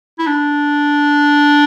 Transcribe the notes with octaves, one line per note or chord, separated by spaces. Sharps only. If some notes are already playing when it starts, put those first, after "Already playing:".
E4
D4